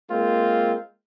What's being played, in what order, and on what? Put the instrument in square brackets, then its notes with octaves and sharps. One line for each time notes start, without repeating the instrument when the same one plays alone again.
[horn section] G#3 A#3 C4 F4